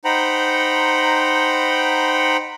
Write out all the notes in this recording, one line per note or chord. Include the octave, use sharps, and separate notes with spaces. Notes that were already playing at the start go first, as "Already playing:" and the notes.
D#4 C5 F#5 G5 A#5 B5